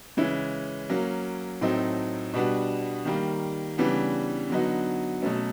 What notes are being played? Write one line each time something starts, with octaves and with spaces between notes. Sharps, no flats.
C#3 E3 G#3 C#4 E4
F#3 A#3 C#4
A2 F#3 A3 C4 D#4
B2 G3 B3 D4 F#4
D#3 G3 A#3
C#3 E3 G3 B3 D4
D3 F#3 B3 D#4 F#4
B2 F#3 A3 C#4